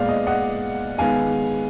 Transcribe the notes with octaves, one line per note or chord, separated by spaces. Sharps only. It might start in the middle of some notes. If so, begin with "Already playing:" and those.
Already playing: A#2 G#3 B3 D5 F5
D#5
D#5 F#5
D#3 G#3 B3 F5 G#5